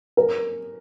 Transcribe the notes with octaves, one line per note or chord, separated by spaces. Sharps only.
A#4